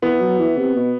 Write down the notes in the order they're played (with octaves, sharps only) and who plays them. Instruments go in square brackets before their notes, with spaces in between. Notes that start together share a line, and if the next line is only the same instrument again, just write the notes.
[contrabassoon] E3 [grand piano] B3
[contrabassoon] F#3
E3
C3
B2